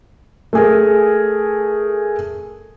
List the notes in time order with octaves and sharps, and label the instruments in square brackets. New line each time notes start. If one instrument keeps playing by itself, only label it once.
[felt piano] A3 G#4 A#4